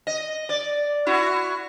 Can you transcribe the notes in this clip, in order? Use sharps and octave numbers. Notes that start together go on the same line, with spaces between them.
D#5
D5
E4 F#4